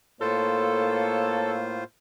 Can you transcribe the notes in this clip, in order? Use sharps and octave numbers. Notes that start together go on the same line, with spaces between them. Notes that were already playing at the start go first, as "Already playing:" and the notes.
A2 A#3 F4 A4 C5 C#5